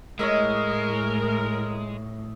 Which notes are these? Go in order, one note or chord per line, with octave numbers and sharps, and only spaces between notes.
A2 G#3 A#4 C#5 D#5 E5